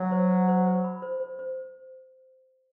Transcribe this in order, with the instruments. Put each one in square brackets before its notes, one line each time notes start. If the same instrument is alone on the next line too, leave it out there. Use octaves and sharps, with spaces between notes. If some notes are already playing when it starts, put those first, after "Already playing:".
Already playing: [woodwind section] F#3
[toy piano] C5
C5
C5
C5
B5
C5
C5
C5